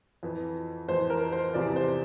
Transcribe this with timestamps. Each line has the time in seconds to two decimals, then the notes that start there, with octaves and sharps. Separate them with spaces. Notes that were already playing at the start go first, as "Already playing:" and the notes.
0.23 F2 E3
0.88 F2 E3 C5
1.10 A#4
1.32 C5
1.53 E2 C3 F3 D5
1.76 C5